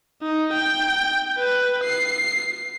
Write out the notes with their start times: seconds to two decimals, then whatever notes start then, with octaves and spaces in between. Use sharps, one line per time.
0.22 D#4
0.53 G5
1.38 B4
1.84 C7